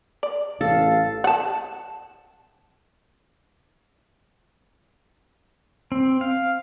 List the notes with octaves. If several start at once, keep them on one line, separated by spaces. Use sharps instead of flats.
D5
A1 A4 F5
F#5 A5
C4
F5